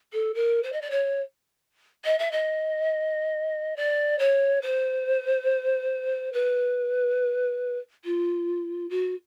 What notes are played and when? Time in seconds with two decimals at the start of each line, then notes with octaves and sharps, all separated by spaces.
0.13 A4
0.34 A#4
0.63 C5
0.72 D#5
0.82 D5
0.91 C#5
2.05 D#5
2.19 E5
2.32 D#5
3.76 D5
4.19 C#5
4.62 C5
6.33 B4
8.04 F4
8.89 F#4